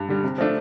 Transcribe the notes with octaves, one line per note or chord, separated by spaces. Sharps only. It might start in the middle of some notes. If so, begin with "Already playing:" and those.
Already playing: G2
D3 G3
C3
F3 A3 D4